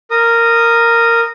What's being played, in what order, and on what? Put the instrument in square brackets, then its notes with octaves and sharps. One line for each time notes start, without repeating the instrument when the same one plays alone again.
[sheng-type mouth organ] A#4 D#6